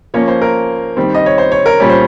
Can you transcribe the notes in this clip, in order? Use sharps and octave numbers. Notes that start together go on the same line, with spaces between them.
F3 A#3 C#4 C#5
C5
A#4
D#3 G3 C4
D#5
C#5
C5
C#5
A#4
A#2 G3 C#4
C5